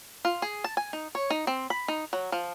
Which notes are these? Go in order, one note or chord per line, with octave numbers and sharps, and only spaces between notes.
F4
G#4
A5
G#5
D#4
C#5
D#4
C4
B5
D#4
F#3
F3